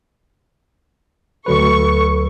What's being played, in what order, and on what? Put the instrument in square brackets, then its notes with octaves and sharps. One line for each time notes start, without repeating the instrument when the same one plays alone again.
[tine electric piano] D2 F#3 B4 [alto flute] A4 [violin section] C#6